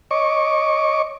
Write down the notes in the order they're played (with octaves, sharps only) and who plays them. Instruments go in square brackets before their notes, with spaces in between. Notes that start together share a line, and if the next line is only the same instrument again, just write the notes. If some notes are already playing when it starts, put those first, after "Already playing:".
[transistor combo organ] C#5 D#5 C#6 D6